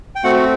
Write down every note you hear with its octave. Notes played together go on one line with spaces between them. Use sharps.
G5
A3 C4 F#4 F#5